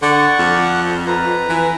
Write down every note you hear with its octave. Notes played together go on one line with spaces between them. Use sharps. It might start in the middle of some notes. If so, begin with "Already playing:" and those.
D3 D5 F#5 C#6
F2
B4 A#5
E3